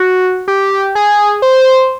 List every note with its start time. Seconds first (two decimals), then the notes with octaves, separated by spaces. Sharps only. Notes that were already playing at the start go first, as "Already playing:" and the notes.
Already playing: F#4
0.48 G4
0.95 G#4
1.42 C5